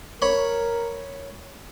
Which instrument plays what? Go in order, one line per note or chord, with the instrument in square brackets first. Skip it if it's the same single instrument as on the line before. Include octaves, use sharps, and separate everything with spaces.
[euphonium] A#4 [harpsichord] C#5 B5